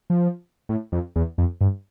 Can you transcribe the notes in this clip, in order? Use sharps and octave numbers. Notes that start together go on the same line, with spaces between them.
F3
A2
F2
E2
F2
G2